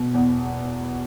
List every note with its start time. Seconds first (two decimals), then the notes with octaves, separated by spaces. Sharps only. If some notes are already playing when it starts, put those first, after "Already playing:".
Already playing: B2
0.14 E2